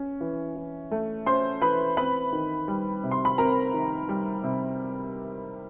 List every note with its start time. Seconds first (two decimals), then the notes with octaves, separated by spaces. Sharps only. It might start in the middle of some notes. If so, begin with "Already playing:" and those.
Already playing: C#4
0.21 E3
0.56 E3
0.91 A3
1.26 C#4 C5 C6
1.62 E3 B4 B5
1.97 C4 B4 B5
2.33 D#3
2.68 G3
3.03 C3
3.11 C6
3.25 B5
3.38 C4 A#4 A#5
3.74 D#3
4.09 G3
4.44 C3